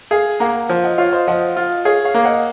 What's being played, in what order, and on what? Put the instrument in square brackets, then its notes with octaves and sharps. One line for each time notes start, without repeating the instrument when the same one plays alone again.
[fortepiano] G#4 [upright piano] F5 G#5
[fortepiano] A#3 [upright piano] F#5 A#5
[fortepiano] F3
[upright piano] D#5 F#5
[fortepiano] F4 [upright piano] C#5 F5
[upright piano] C5 D#5
[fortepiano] F3 [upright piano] D#5 F#5
[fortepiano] F4
[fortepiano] G#4 [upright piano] C#5 F5
[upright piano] C#5 F5
[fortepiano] A#3
[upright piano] D#5 F#5